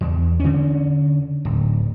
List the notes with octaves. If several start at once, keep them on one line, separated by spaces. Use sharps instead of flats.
E2
D3 C#4
D1